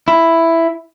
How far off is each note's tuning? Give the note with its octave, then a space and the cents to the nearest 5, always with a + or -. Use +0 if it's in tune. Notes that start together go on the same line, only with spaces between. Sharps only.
E4 +5